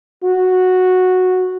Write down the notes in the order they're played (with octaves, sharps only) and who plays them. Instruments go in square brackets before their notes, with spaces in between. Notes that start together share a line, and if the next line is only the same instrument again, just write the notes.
[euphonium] F#4